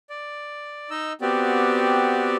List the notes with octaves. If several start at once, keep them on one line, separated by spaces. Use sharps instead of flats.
D5
D#4 D#5 E6
B3 C4 F#4 G4 D5